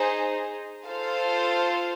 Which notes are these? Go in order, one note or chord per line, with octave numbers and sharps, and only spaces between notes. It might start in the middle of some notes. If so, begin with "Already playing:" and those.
Already playing: D#4 G#4 C5
F4 A4 C5 F5